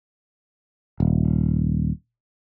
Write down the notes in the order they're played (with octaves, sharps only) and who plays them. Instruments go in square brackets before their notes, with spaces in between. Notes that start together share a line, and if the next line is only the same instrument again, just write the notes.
[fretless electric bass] D#1